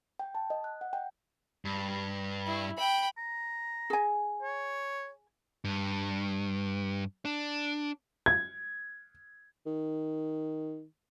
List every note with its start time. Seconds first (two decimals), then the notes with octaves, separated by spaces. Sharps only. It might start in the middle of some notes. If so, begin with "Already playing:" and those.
0.19 G5
0.35 A5
0.50 D#5
0.64 F#6
0.81 F#5
0.93 G5
1.65 G2
2.47 E4
2.78 G5 B5
3.18 A#5
3.90 G#4 G#5
4.42 C#5
5.65 G2
7.25 D4
8.26 G#6
9.66 D#3